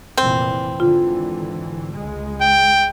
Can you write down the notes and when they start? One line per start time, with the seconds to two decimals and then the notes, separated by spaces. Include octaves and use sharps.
0.18 F1 A#2 E3 C4
0.80 G#1 D3 E3 F4
1.93 C#2 G#3
2.42 G5